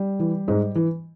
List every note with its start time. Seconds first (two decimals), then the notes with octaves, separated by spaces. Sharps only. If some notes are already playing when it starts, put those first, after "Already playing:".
Already playing: G3
0.20 E3
0.48 G#2
0.75 E3